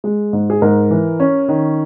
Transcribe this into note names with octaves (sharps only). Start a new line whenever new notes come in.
G#3
G#2
G#4
G#2 A#4
E3
C#4
D#3